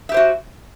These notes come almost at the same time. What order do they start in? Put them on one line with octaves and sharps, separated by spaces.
E5 G4 C5 F#4